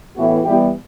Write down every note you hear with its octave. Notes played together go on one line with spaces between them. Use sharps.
A2 E3 B3 F#4
E3 G3 B3 E4 G4